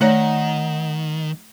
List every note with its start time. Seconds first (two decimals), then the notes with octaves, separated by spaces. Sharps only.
0.01 D#3 A3 D#4 C#5 D5 F#5 A#5